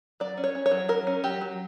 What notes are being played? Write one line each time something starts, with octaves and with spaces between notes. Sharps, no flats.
F#3 D5
C#4
C#5
C#4
C#5
F#3
F#3 A#4
C#4
F#3 G4
F#3